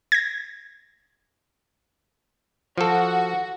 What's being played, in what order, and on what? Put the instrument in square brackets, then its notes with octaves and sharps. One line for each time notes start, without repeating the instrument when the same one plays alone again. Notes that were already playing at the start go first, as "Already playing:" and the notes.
[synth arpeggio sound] G#6 A#6
[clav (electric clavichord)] F3 A4 [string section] F#4